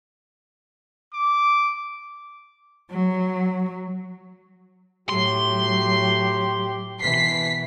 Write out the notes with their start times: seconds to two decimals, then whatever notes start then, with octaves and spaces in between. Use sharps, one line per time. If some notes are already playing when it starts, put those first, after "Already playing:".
1.13 D6
2.91 F#3
5.09 A2 F#3 G4 C6
7.00 B2 E3 B6 C7